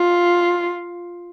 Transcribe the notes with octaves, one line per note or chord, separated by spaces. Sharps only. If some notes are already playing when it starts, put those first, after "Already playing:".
Already playing: F4